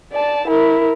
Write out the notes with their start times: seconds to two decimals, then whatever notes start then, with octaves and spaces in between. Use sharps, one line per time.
0.12 D5 A5
0.48 E4 A#4